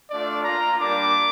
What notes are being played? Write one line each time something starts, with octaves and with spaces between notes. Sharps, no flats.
A3 D4 F4 D5
A#3 F4 A#5
G3 A#3 D4 D6